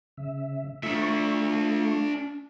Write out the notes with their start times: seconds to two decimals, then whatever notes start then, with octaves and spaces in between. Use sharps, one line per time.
0.17 C#3 E5
0.83 A3 D4 F4 E5 C#6